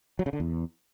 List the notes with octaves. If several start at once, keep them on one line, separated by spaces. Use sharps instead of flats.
F#3
C#3
D3
E2